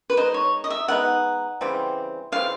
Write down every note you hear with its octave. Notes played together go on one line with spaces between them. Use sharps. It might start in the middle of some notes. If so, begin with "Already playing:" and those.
B4
G#3 B3 D#4 C5
C#5
D#5
E5
G#3 B3 D#4 F#5
C#3 E3 G3 C4
C#3 E3 G3 C4 F5